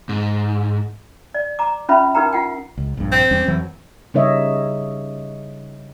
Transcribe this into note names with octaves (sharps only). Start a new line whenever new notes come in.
G#2
D5
A#5 D6
C#4 F4 B4 E5 B5
D#4 G4 A#4 B4 G5 A#5
F4 F#5 G5
C#2
A#1 G2
C4
E2 G3 C#4
F2 E3 F#3
C#3 G3 D#4 C#5 D#5 E5